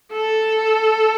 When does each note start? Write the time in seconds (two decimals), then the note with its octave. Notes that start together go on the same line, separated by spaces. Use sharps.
0.12 A4